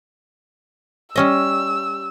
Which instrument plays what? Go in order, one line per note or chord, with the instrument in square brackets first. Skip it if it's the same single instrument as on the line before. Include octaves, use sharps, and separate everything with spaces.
[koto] G3 C#4 D#5 [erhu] E6